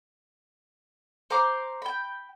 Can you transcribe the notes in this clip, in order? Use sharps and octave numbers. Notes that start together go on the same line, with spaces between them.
C5 A#5 C6 D6
G5 B5